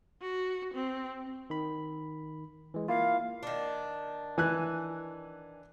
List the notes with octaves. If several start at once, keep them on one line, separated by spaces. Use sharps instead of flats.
F#4
C4
D#3 B5
E3 G#3
A#3 E4 F4 F5
D#3 D4
E3 G#5 F#6